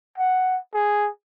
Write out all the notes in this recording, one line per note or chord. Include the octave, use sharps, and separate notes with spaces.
F#5
G#4